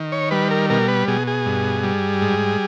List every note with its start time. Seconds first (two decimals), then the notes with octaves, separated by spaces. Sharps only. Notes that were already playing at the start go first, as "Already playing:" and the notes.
Already playing: D#3
0.12 C#5
0.31 G3 B4
0.51 A#4
0.70 B2 A#4
0.88 B4
1.08 B2 G#4
1.27 G#4
1.46 G2
1.84 G3
2.22 G#2